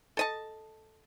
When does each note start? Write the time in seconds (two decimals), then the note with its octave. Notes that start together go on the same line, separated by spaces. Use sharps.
0.17 A4 D#5 A5